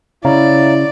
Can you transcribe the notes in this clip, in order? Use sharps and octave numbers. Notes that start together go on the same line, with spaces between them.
C#3 E4 C#5 D5 F5 A#5